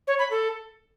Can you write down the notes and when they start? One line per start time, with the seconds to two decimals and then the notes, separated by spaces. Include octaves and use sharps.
0.07 C#5
0.19 B5
0.30 A4